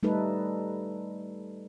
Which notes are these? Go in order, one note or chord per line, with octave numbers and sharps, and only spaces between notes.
G3 A3 D#4 A4 B4